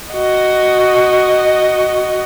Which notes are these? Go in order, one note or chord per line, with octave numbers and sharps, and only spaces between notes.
F#4 D#5